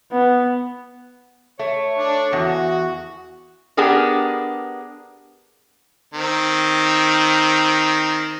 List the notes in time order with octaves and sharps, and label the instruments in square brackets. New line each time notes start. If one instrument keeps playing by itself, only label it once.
[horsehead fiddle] B3
[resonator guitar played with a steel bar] A3 [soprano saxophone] C#5
[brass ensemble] D4
[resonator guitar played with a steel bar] E2 [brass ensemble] F#4
[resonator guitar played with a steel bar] B3 D4 G4 G#4 A#4
[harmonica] D#3 C4